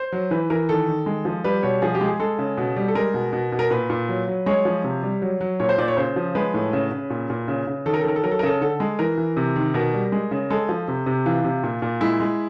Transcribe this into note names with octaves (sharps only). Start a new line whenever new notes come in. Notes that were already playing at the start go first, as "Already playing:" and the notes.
Already playing: C5
F#3
E3 B4
E3 A#4
D#3 A4
D#3
G#3
F3
G3 B4
B2 C#5
F3 G#4
G4
G#3
G#4
G#3 A4
C#3
B2
G3
A4
G#3 A#4
B2
B2
B2
A#4
A#2 B4
A#2
F#3
F#3
G#3 C#5
F3
C3
G3
F#3
F#3
A#2 C#5
C5
A#2 D5
C#5
C#3 C5
F3
G#3 B4
A2
C#3
C#3
A#2
A#2
C#3
C#3
D#3 A4
A#4
A4
D#3 A#4
A4
F#3 A#4
A4
A#4
C#3 A4
D3 A4
G#3
E3 A#4
E3
C3
D#3
B2 A#4
G3
G#3
C#3
G#3 A4
F3
C3
C3
E3 F4
C3
A#2
A#2
G#3 E4
G#3